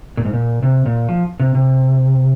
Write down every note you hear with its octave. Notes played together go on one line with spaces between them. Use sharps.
A#2
G#2
A#2
C3
A#2
F3
C3
C3